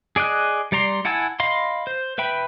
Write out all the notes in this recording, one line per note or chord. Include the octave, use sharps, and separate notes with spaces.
G#4 D5 D#5 F#6
G3 D5 A#5 C6
E4 F#5 G#5 A5 E6
D#5 F5 B5 C6
C5
B4 E5 G5 B5